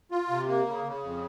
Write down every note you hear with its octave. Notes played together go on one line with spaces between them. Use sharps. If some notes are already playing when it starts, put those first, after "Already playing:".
F4
C3
A#3
C#3
C#3
F2